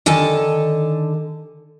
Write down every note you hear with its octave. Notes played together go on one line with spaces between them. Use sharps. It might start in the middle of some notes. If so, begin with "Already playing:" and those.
D3 D#3 A4 G#5 A5